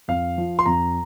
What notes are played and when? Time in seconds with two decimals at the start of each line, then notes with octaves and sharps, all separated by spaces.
0.08 F2 F5
0.38 F3
0.59 C6
0.66 F2 A#5